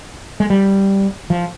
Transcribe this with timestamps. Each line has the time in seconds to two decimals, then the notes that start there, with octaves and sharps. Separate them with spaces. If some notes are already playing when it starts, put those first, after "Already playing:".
0.40 G#3
0.50 G3
1.30 F3